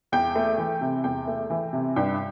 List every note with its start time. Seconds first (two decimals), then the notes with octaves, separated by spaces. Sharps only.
0.12 E2 G5
0.35 A3
0.58 E3
0.81 C3
1.04 E2 G5
1.27 A3
1.50 E3
1.73 C3
1.96 G2 G5